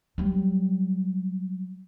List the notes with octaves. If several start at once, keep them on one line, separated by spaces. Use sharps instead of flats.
F#3 G3